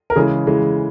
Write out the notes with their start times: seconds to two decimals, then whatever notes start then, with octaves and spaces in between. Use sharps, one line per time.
0.10 A#4
0.16 C#3 E3 G#3 G#4
0.47 C#3 E3 G#3